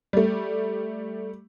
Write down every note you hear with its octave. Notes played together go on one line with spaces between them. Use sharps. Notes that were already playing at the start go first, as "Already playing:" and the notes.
G3 A3